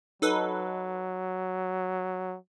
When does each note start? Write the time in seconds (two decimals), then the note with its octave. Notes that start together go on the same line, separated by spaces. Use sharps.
0.22 F#3 D#4 A4 B4